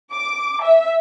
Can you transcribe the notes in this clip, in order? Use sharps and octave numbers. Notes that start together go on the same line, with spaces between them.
D6
E5